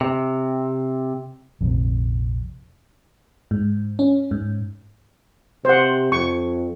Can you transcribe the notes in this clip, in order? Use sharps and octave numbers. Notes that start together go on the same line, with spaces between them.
C3
A#1 F2 C3
G#2
C#4
G#2
C3 C5 F#5
F2 C#6